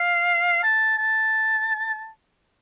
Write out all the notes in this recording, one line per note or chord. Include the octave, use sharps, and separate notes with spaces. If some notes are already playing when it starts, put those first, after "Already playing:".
Already playing: F5
A5
A5